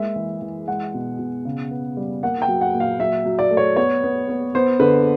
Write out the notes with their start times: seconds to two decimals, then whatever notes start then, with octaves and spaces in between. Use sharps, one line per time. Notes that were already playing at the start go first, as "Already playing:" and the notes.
Already playing: G#3 A#3 E5
0.16 E3
0.42 E3
0.68 G#3 F#5
0.94 B2
1.19 B2
1.45 C#3
1.71 B3
1.97 G3
2.23 A#3 F#5
2.42 G5
2.48 F#3
2.61 F#5
2.74 A#2
2.80 F5
2.99 F#3 E5
3.25 F#3
3.39 D5
3.51 A3
3.57 C#5
3.77 B3 C#5
4.03 B3
4.29 B3
4.55 B3 C5
4.80 D3 B4